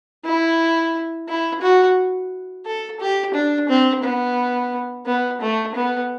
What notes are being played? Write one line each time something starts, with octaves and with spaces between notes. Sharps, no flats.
E4
E4
F#4
A4
G4
D4
C4
B3
B3
A3
B3